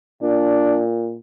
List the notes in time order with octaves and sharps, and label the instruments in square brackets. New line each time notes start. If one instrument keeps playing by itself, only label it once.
[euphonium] A#2 [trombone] D4